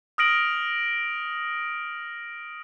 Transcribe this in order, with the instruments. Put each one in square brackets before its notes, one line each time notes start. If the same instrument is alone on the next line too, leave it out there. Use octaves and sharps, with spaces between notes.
[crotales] D#6 F6 A#6 D7 F#7